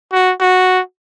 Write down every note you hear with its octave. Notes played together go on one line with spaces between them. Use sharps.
F#4
F#4